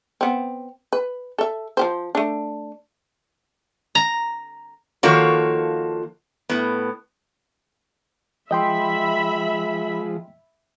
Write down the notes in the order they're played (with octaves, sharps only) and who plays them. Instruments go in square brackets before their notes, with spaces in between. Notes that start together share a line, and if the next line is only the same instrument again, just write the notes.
[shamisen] B3 C4
B4
A4 E5
F3 G4 C5
A3 D4
[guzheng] A#5
[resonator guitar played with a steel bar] D#3 F3 A#3 F#4 A4 C#5
A2 B3
[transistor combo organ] F3 G#3 [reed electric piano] D#5 G5 C6 [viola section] E5 B5